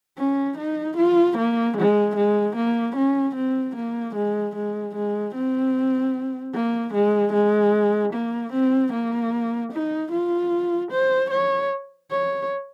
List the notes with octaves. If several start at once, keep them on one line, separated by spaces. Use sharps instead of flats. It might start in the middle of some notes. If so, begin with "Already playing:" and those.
C#4
D#4
F4
A#3
G#3
G#3
A#3
C#4
C4
A#3
G#3
G#3
G#3
C4
A#3
G#3
G#3
A#3
C4
A#3
D#4
F4
C5
C#5
C#5